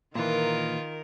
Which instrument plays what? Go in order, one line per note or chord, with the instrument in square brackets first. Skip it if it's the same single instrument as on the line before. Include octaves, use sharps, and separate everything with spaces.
[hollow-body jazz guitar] A#2 E3 [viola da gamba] D#3 A#4 [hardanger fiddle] F4